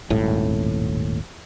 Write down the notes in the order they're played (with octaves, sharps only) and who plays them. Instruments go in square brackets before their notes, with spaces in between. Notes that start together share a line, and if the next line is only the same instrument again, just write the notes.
[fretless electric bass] D#1 G#1 A2